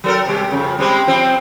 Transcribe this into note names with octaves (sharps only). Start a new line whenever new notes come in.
F#3 A4 A#4
C3 G3
F2 C#3
G3 G#3 C4
F3 C4